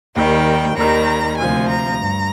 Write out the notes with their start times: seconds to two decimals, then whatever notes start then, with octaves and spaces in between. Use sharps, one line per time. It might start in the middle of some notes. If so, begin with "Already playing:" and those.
0.16 D#2 D#3 G3 G5
0.77 D#2 D#3 G3 A#5
1.38 D2 C3 F3 G#5
1.69 A#5
2.00 G2